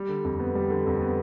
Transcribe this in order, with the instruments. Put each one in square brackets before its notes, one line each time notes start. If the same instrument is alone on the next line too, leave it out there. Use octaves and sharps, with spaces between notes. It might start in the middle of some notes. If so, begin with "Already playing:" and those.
Already playing: [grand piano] G3
D3
F2
B3
G3
D3
F2
B3